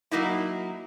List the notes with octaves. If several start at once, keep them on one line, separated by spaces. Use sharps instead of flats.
F#3 A#3 D#4 E4